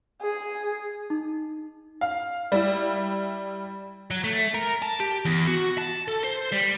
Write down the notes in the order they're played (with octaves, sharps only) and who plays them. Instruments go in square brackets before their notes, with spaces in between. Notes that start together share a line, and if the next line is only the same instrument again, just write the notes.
[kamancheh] G#4
[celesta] D#4
[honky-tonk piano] F5
G3 E4
[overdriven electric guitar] F#3
A3
A#4
A5
G4
E2
F#4
A5
A4
C5
G3